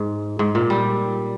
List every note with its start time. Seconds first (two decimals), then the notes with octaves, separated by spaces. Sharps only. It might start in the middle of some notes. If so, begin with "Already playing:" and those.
Already playing: G#2
0.39 G#2
0.55 A#2
0.70 G3